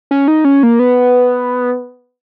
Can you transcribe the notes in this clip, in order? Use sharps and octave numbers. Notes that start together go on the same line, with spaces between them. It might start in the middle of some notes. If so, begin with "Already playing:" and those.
C#4
D#4
C#4
A#3
B3